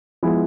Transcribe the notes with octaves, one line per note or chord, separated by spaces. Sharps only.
F3 G#3 B3 E4